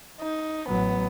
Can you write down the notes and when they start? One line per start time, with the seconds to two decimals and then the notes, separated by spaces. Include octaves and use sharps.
0.20 D#4
0.68 A1 F#3 B3